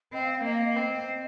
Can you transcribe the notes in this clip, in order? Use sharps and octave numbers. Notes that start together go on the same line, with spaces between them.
C4 D#5
F5
F5
A#3 D#5
F5
D#5
C4